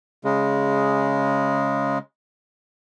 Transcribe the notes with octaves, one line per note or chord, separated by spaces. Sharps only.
C#3 G#3